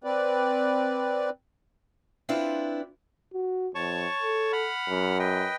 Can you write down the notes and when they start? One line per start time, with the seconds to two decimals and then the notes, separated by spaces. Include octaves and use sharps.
0.04 C4 B4 D5
2.29 C4 D4 E4 F4 B4
3.34 F#4
3.75 F2 C#5 A5 C#6
4.22 A4
4.53 F#5 B5 F6
4.89 F#2
5.19 B4 D#5 G5